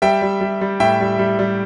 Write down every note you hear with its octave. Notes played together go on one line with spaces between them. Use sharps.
G3 E5 G5
G3
G3
G3
A2 E5 G5
G3
G3
G3